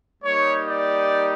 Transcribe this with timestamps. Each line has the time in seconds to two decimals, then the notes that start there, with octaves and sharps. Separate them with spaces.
0.23 G3 A#3 D#4 G4 C#5
0.68 D5